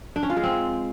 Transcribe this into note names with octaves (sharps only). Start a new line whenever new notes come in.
D4
C#4
F4
G#3
C4